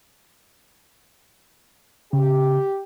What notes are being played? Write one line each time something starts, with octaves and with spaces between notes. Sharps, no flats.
C#3 G4